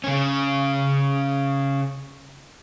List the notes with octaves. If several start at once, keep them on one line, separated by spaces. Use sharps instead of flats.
C#3 C#4